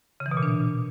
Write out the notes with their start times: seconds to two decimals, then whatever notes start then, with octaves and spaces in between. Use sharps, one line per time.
0.20 C#3
0.26 E3
0.31 B2
0.37 A#2
0.43 D4